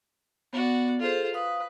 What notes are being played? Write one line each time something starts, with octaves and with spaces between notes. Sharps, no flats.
B3 F#4 D5
F4 G#4 A4 C5
B4 F5 D#6